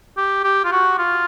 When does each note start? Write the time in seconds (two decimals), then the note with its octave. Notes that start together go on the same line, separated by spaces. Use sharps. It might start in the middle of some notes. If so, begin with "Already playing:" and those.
0.18 G4
0.44 G4
0.65 F4
0.72 F#4
0.99 F4